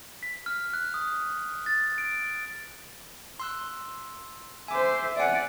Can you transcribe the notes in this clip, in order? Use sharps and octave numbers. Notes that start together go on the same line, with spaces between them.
B6
F6
F#6
D#6
A6
D7
C6 E6 F#6
C5 E5 G#5 D6
D5 E5 F#5 G#5